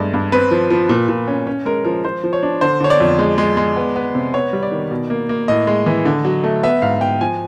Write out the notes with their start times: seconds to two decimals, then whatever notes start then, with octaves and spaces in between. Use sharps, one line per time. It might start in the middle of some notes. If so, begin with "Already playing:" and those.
Already playing: G2 G#3 A3 D5
0.14 G2
0.32 C4 B4
0.51 F3
0.70 F3
0.89 A#2
1.09 A#2
1.28 C#4
1.47 C#4
1.66 G#3 A#4
1.85 F3 A#4
2.05 F3 C5
2.24 F3
2.33 C#5
2.43 D4
2.61 D3 C5
2.80 D3 C#5
2.90 D5
3.00 F2
3.19 G#3
3.38 G#3
3.57 G#3
3.76 B3
3.96 B3
4.15 C3
4.34 B3 C#5
4.53 G3
4.63 D5
4.71 D#3
4.91 B2
5.10 A#3
5.29 A#3
5.48 A2 D#5
5.67 G#3
5.86 E3
6.05 D3
6.25 F#3
6.44 A3
6.63 B3 E5
6.82 G#2 F5
7.01 G#2 G5
7.21 F3 G#5